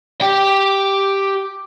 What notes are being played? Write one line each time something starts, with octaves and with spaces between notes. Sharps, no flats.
G4 G5